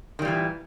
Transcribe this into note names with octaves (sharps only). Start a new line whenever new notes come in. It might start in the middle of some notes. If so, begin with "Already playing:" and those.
A#2 D#3 E3 G3